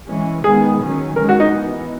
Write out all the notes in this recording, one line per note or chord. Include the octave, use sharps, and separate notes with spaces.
E3 G#3 C#4
D#3 G#3 B3 G#4
D#3 F#3 C#4
D#3 G#3 C#4 A#4
F#4
D#4
E3 B3